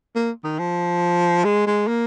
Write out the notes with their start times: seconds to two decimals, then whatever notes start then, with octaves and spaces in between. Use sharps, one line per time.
0.15 A#3
0.44 D#3
0.59 F3
1.44 G#3
1.66 G#3
1.87 A#3